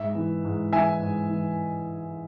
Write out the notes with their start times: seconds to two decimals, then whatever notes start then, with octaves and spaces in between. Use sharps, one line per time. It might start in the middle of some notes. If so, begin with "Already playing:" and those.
Already playing: G#2 E5
0.15 E3
0.44 G#2
0.73 E3 E5 G#5
1.01 G#2
1.30 E3